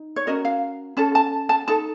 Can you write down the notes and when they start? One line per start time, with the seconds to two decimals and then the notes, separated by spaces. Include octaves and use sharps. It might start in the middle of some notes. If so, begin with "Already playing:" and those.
Already playing: D#4
0.16 C#5
0.27 C#4 F#4 A#4 D#5
0.45 F5
0.97 C#4 A4 A5
1.15 A5
1.49 A5
1.68 D#4 A4 A5